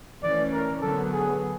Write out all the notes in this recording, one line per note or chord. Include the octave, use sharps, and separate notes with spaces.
E3 A3 C#4 D5
A#4
D3 F#3 B3 A4
G#4